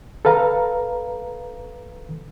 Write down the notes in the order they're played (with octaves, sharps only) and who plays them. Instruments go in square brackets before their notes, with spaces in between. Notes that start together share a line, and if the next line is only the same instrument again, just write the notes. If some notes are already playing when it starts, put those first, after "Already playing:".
[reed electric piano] A4 B4 F5 A#5